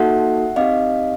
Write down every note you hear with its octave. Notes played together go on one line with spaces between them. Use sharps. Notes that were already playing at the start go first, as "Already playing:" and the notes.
Already playing: A#3 D#4 F#4 A4 E5 F#5
C4 D#4 G4 D#5 F5